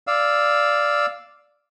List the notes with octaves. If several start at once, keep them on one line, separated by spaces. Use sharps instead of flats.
D5 F5 E6